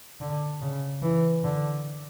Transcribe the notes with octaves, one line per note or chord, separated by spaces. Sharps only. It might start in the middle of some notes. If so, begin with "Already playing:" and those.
D3
C#3
E3
D3